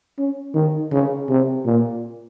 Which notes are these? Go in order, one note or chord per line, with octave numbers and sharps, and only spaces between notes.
C#4
D#3
C#3
C3
A#2